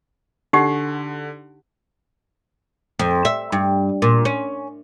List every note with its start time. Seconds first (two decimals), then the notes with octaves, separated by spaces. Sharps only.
0.53 D3 D#4 G4 F#5
2.99 F2
3.25 E5
3.52 G2
4.02 A#2
4.25 C#4